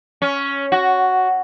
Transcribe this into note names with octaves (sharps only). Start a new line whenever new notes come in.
C#4
F#4